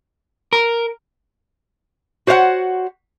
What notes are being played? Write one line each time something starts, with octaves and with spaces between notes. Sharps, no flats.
A#4
F#4 C5 C#5 F5 F#5